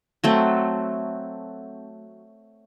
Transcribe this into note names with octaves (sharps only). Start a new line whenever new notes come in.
F#3 A3 C4